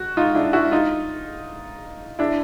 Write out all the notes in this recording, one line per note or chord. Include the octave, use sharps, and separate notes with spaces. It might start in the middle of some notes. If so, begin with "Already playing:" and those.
Already playing: F#4
D#4 F4
D4 E4
E4 F#4
D#4 F4
D4 E4